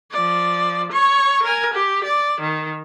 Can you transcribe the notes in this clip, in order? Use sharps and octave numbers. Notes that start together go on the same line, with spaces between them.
F3 D5
C#5 C#6
A#4 G#5
G4
D5
D#3